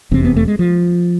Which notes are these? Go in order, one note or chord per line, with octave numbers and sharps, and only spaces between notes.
F1 E2 C3 C4
B3
A3
G#3
F3